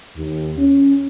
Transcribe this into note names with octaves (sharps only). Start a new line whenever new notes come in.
D#2
C#4